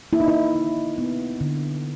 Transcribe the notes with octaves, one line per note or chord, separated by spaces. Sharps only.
A#3 E4
D#4
E4
D3
B3
D3